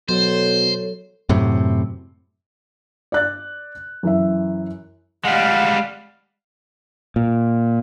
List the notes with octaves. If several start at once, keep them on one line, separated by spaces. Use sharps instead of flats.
B2 F#3 A4 C5 C#5
F#2 A2 C3
D5 F#6 A6
F#2 E3 E5
G3 G#3 F5 F#5
A#2